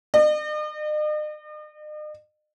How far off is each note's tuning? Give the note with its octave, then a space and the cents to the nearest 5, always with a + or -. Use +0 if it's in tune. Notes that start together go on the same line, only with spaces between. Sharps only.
D#5 -45